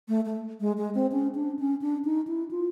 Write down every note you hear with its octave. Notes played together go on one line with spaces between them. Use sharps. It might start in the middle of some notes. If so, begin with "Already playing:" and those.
A3
A3
G#3
G#3
C4
C#4
D4
C#4
D4
D#4
E4
F4